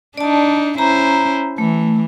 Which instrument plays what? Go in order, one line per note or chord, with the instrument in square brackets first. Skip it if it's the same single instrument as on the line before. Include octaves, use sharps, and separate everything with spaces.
[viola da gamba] D4 D#4 [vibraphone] D5 A5
[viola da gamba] C#4 E4 C5 [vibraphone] A#5
[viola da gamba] E3 [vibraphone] A3